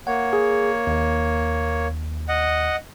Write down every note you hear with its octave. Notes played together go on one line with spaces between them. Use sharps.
A#3 C#5 F#5
G#4
D#2
D#5 F#5